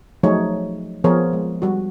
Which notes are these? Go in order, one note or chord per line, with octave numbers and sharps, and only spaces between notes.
F3 F#3 A3 D#4 G#4 C#5
F3 B3 G#4 A#4 C#5
G#3
G3 F#4